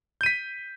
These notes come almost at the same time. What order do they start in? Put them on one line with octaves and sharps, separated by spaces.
G6 D#7 B6